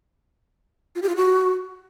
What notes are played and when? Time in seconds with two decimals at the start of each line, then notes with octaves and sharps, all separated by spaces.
0.95 F4
1.02 G4
1.09 F4
1.16 F#4